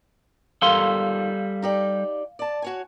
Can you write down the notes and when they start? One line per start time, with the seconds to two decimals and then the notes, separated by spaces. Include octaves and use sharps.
0.62 F2 G#2 D#3 G3 A4 F5 C6
1.62 D#4 G4 D5
2.39 D5 A5
2.62 F#4 C#5 G#5